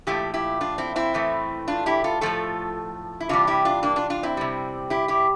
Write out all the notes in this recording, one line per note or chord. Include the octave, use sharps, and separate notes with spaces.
A#2 F3 A3 E4 G4
E4 G4
D4 F4
C4 E4
C4 E4
A2 E3 A3
D4 F4
E4 G4
F4 A4
A2 F3 A3 F4 A4
E4
C3 E3 G3 D4 F4
E4 G4
D4 F4
A#3 D4
D4 F4
D4 F4
C4 E4
C3 G3
E4 G4
E4 G4